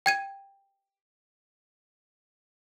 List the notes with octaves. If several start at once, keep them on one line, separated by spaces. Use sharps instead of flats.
G5 G#6 D#7